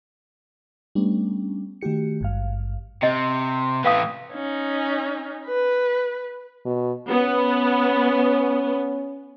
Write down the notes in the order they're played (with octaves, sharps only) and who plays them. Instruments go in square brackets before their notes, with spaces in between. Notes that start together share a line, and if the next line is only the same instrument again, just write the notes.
[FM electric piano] G3 A3 B3 C#4 D4
D#3 A3 F#4 G4 C#7
G#1 G2 F5
[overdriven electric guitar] C3 [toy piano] D#5
[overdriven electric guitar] A2 E3 [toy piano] B4 F5 D#6
[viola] C#4 D#4
B4
[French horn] B2
[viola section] B3 [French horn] C#4